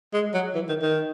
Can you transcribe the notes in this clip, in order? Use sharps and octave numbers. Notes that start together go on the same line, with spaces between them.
G#3
F#3
E3
D#3
D#3